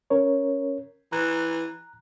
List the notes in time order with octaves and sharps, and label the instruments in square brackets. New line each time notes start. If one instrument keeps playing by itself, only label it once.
[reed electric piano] C#4 A#4 C#5
[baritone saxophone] E3 [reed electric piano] A#5 F#6